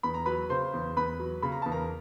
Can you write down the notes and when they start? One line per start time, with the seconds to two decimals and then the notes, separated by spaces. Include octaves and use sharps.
0.03 E2 B5
0.14 A#5
0.26 F#3 B4 B5
0.50 C#3 C5 C6
0.73 E2
0.97 E2 B4 B5
1.19 F#3
1.42 C#3 B5
1.52 A#5
1.62 E2 A5
1.71 A#4 A#5